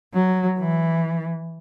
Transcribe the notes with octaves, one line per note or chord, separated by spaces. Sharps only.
F#3
E3